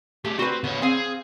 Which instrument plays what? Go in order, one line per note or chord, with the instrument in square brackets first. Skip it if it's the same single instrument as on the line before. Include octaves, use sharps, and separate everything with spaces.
[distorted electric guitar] A3 G#4 [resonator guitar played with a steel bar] G4
[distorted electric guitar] C4 [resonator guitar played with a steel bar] F#4 B4
[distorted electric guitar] D3 C#5 [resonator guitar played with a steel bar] B3
[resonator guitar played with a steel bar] C4 F5 [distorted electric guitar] G#4